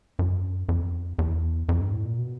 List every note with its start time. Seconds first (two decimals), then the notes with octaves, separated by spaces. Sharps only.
0.19 F#2
0.69 F2
1.19 E2
1.69 F2
1.81 G2
1.93 A2
2.05 A#2
2.18 B2